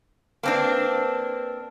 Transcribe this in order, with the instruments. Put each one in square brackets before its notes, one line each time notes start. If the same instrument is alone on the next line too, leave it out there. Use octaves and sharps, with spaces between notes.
[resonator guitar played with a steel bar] A#3 C4 D4 [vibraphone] B4 A5